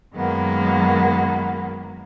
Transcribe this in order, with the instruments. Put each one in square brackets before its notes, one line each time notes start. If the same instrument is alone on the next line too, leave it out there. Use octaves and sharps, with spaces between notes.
[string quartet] F#2 D#3 F#3 G#3 A#3 B3